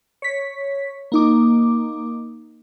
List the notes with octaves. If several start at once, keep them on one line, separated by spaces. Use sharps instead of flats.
C#5 B6
A#3 D#4 D6